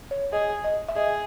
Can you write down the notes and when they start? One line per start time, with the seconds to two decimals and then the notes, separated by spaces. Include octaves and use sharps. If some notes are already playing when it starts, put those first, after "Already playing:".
0.11 C#5
0.32 G#4 D#5
0.64 D#5
0.89 E5
0.96 G#4 D#5